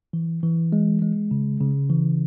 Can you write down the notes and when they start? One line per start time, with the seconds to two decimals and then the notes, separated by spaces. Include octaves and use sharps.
0.13 E3
0.43 E3
0.72 G#3
1.02 G#3
1.31 C#3
1.60 C#3
1.90 E3